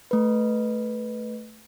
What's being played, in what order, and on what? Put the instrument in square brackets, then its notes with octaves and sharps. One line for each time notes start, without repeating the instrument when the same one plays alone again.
[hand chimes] A3 B4